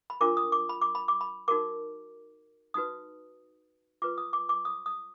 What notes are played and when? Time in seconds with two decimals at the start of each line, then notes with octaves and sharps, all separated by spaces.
0.10 B5
0.21 D4 F4 A#4 D6
0.37 D#6
0.52 D6
0.69 B5
0.82 D6
0.95 B5
1.08 D6
1.21 B5
1.48 D#4 F#4 A#4 D6
2.74 D#4 F#4 B4 D#6
4.02 F4 B4 D6
4.18 D#6
4.33 D6
4.49 D6
4.65 D#6
4.86 D#6